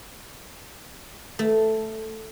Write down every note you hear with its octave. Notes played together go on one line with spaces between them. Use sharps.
A3